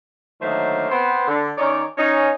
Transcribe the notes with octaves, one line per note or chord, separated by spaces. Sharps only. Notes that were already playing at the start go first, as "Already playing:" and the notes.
D3 D#3 F#3 A3 A#3 C5
B3 C4 C5
D3
D#3 C#4 D#4 C#5 D5
C#4 D#4